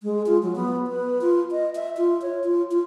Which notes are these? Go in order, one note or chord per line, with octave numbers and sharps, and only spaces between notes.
G#3
F4
F#3
B3
B4
F4
D#5
E5
F4
C#5
F4
F4